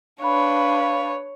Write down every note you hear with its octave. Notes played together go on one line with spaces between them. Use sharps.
D4 B4 C#5 F5 B5 F#6